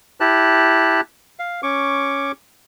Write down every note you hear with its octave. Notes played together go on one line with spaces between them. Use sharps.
E4 G4 A5 F#6
F5
C#4 C#6 D6